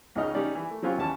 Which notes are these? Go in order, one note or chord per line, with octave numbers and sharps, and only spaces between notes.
C#2 C#3 D#4 D#5 F6
G3 C#4 D#4 D5
E3
A3
F#3 C4 C#4 F4 G4
D#2 E3 C#4 A5